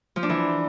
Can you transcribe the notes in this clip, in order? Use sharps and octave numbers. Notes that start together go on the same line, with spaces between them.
F3
D4
E3